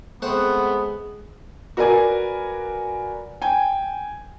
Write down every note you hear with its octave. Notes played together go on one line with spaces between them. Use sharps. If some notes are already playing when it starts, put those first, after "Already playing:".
G#3 A3 B3 C4 F#5
F#4 A#4 B4 D5 G#5
G5 G#5